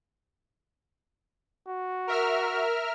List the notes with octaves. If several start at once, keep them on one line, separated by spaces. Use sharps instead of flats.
F#4
A#4 E5 F6